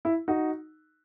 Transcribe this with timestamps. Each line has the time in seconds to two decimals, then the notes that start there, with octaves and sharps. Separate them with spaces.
0.05 E4
0.28 D#4 F#4